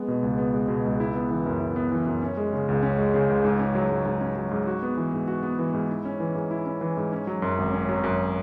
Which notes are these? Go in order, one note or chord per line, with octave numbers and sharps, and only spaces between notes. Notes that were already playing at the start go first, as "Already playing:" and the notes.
Already playing: G#3 B3
B2
C#2
B3
G#3
B2
C#2
E4
B3
E3
F#2
E4
B3
E3
F#2
C#4
G#3
C#3
C#2
C#4
G#3
C#3
C#2
G#2
C#4
F#3
G#2
G#2
C#4
F#3
G#2
F#4
B3
E3
G#2
F#4
B3
E3
G#2
E4
C#4
E3
G#2
E4
C#4
E3
G#2
C#4
F#3
F#2
G#1
C#4
F#3
F#2